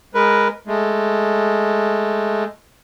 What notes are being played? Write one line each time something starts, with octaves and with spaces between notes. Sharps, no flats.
G#3 A#4 B4
G#3 A3